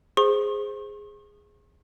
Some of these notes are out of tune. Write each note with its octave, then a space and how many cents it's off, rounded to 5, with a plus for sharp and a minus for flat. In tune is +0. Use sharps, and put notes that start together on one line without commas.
G#4 -5 C5 +0 C#6 -45